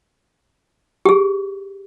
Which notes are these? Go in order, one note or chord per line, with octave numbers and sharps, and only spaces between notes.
G4 G#4